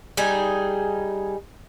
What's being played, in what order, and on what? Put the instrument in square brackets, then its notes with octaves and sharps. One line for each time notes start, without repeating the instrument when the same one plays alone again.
[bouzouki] G3 D#4 G#4